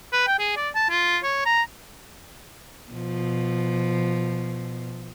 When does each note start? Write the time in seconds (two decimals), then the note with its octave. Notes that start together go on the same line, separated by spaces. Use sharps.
0.13 B4
0.28 G5
0.39 G#4
0.57 D5
0.75 A5
0.90 F4
1.24 C#5
1.46 A#5
2.92 B2 F3